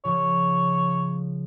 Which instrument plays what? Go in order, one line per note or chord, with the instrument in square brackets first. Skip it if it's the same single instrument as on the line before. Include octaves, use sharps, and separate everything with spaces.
[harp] C#3 F3 [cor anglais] C#5